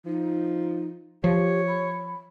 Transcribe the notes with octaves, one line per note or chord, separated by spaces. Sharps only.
F3 D#4
F3 G4 C#5
B5